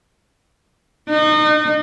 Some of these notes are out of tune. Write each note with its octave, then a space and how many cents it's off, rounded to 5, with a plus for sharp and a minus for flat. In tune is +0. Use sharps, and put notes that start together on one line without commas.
D#4 -30